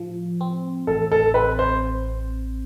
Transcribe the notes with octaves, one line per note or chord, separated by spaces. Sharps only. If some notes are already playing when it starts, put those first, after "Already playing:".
Already playing: A2 F3
C4
A1 A4
A4
C4 B4
C5